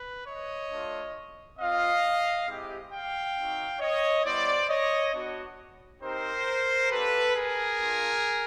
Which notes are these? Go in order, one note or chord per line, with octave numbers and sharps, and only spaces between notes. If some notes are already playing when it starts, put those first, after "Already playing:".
Already playing: B4
C#5 D#5
A3 D4 F4
C4 F4 D#5 F5
G#3 C4 E4 G4
F5 G5
C4 D#4 F#4
C#5 D#5
G3 B3 E4 C5 D5
C#5 D#5
B3 D4 F#4
C4 D#4 G4 A#4 C5
A#3 D4 G4 A4 B4
G#4 A#4
A#3 D4 F4